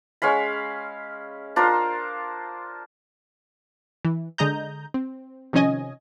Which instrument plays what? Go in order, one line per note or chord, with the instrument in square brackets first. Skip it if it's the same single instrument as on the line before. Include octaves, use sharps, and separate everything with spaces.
[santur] G#3 C#4 F5 B5
D4 F4 A#4 C5
[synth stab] E3
D3 G#3 D#5 A#5 G6
C4
C3 D#3 F3 C#4 D#5 G#5